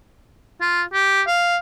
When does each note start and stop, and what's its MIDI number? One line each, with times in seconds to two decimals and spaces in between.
0.61 0.82 65
0.93 1.22 67
1.27 1.56 77